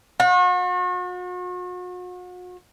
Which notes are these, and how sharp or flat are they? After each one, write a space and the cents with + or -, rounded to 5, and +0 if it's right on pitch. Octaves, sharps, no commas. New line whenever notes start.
F#4 -40